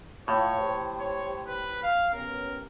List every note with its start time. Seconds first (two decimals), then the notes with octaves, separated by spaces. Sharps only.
0.28 A2 F4 C#5
0.59 G4 C5
0.99 C#5
1.47 B4
1.83 F5
2.13 B3 C#4 G4 A#4